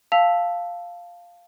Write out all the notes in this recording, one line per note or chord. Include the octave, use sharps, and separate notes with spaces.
F5 A5 E6 B6 F7